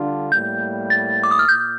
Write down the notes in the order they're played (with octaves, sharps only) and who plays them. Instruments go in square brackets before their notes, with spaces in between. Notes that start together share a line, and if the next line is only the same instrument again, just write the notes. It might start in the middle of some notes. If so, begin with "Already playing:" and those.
Already playing: [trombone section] D3 G3 D4 F4
[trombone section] A2 G3 A#3 [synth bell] G6
[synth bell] A6
D6
D#6
F6
[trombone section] A#2 [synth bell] G6